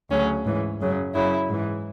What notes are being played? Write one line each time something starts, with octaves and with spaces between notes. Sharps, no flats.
D2 C#3 F#3 C#4
G#2 E3
F#2 C#3 F#3
F#2 C#3 F#3 E4
G#2 E3